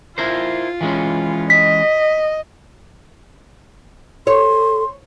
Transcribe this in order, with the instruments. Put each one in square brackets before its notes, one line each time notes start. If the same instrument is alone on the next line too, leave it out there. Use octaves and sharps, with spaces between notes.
[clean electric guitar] E4 A#4 C5 [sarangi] F4
[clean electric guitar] E3 G#3 C#4
[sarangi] D#5 [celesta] B6
[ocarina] A4 [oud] C#5 [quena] C6